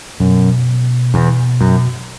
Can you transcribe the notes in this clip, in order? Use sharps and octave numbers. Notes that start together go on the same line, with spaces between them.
F#2 B2
E2
F#2